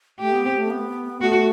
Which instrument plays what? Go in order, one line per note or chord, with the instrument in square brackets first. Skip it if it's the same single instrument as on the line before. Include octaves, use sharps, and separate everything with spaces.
[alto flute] A3 [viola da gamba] G4
[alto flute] B3
C4
A3
B3
[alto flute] A3 [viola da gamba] F#4